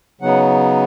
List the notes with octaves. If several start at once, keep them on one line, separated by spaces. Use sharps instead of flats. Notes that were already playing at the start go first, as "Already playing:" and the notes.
C#3 F#3 B3 D#4 F#5